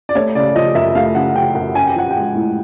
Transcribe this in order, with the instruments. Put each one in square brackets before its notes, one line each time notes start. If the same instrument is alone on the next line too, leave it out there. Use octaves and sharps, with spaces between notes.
[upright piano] D5
A3 C#5
C#3 D5
F3 D#5
F#2 E5
A3 F5
C#3 F#5
F3 G5
F#2 F#5
C#4 G#5
G5
F3 F#5
G#3 G5
A2